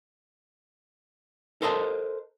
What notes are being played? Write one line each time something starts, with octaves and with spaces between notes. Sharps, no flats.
A4 A#4 C5 D#5 G#5 A5